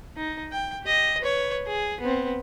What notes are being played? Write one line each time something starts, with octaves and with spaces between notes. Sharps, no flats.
D#4
G5
G4 D#5
B4 C#5
G#4
B3 C4